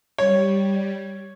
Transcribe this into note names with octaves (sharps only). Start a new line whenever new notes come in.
G3 C#5